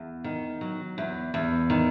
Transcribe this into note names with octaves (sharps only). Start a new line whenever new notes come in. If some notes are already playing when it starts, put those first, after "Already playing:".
Already playing: E2
D#3
F#3
E2
E2
D#3